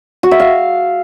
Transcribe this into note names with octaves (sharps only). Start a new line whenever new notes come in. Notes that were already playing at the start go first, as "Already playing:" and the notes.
F#4
E5
F5